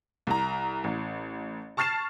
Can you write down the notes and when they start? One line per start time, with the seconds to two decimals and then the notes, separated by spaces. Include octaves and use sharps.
0.27 C2 A#5
0.84 A1
1.77 A5 C#6 F6 A6 C7 E7